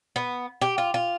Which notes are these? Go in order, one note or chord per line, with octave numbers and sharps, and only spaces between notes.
B3
G4
F4
F4